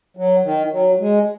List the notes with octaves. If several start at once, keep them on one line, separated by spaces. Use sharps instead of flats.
F#3
D#3
F#3
G#3